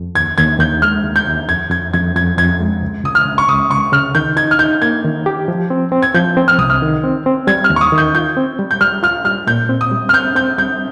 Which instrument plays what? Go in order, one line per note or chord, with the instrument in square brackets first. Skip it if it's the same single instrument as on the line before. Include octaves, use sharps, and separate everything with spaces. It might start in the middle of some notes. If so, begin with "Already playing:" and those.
Already playing: [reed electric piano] F2
[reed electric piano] D#2 [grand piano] G#6
[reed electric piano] D#2 [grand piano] G#6
[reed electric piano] D#2 [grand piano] G6
[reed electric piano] G#3 [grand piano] F6
[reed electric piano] D#2
[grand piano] G6
[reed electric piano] D#2
[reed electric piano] F2 [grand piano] G#6
[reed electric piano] F2 [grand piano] G#6
[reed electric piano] F2 [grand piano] G#6
[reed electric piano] F2 [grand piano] G#6
[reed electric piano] F2 [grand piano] G#6
[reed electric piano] G#3
C#2
[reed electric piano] C#2 [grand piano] D#6
[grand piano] F6
[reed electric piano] C#2
[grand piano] C#6
[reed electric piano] C#2 [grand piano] D#6
[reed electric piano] C#2 [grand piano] C#6
[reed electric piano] C#3 [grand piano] F6
[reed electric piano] D#3 [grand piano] G6
[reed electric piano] D#4 [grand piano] G#6
[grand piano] F6
[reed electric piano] D#4 [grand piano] G6
[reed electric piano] A#3 [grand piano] G#6
[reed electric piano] D#3
G4
F3
C4
C4
[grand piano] G#6
[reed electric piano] F3 [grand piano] G6
[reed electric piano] C4
[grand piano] F6
[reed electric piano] C2 [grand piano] D#6
[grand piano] F6
[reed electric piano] D#3
C4
C4
[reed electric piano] G3 [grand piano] G#6
[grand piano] F6
[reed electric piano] D#2
[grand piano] C#6
D#6
[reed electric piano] D#3
[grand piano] G6
[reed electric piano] F4 [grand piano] G6
[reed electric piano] C4
G3
[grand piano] G6
[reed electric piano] G3 [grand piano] F6
[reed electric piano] F4 [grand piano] F6
[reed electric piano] G3 [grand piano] F6
[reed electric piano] A#2 [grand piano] G6
[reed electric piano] C4
[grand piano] D#6
[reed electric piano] G3
[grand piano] F6
[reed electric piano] C4 [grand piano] G6
[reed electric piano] C4 [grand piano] G6
[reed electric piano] G3 [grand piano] G6